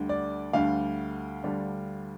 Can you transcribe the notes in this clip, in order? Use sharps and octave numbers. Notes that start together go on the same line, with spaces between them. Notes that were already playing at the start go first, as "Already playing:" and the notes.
Already playing: D2 D3 G3 D4
D5
D2 D3 G3 D4 F5
D2 D3 G3 D4